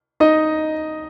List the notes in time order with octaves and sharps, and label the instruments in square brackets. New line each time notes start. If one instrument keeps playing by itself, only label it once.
[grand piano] D#4 D#5